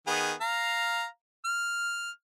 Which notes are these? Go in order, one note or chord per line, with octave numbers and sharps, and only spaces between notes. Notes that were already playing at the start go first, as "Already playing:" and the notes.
D#3 B3 G#4
F5 A#5
F6